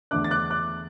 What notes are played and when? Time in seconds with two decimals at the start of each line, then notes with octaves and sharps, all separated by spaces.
0.11 E2 D3 A3 D4 D6 F#6
0.24 A6
0.31 D6 F#6
0.50 D6 F#6